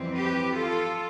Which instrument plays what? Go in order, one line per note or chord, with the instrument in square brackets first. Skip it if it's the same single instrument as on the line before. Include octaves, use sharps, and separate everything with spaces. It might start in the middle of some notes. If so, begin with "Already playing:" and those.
Already playing: [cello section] F2 E3 G3 C4
G4 B4
F4 A4